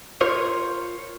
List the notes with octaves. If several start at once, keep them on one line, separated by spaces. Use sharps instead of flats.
F4 A#4 C5 C#5